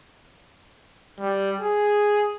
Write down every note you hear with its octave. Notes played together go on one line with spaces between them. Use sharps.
G3
G#4